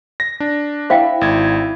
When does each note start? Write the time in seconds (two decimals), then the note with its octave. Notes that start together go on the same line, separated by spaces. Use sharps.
0.20 A#6
0.40 D4
0.90 E4 C5 E5 F5 G5
1.21 G#1 G#6